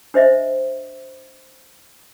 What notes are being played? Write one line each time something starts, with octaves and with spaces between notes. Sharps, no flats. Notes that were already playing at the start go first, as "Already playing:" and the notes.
D4 C5 D#5 E5